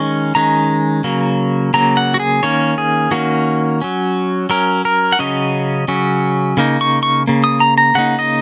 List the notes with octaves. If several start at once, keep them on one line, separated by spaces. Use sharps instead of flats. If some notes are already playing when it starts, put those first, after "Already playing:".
Already playing: D#3 G#3 C#4 C#6
D#3 G#3 C#4 A#5
C#3 F#3 A#3
C#3 F#3 A#3 A#5
F#5
F#4
G#4
D#3 A#3 C#4 C#5
G#4
D#3 A#3 C#4 F#4
F#3 C#4
F#3 C#4 A#4
A#4
F#5
C#3 F#3 C#4 D#5
C#3 F#3 C#4
C#3 A#3 D#4
C#6
C#6
C#3 A#3
D#6
A#5
A#5
C#3 A#3 D#4 F#5
D#5